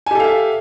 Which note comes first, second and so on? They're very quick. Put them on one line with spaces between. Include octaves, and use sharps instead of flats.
G#5 G4 A4 F5 E5